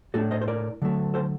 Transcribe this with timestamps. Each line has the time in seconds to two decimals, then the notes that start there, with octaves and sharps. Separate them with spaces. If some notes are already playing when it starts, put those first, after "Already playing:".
0.14 A2 A3 D4 F#4 A4
0.31 C5 D#5
0.42 C5
0.48 A#4 D5
0.82 D3 F#3 A3
1.14 A4 C5